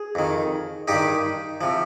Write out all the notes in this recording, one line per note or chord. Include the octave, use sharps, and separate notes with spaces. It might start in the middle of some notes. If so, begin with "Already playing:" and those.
Already playing: G#4
F2 D#3
G2 D#3 D#4 G4
C3 F3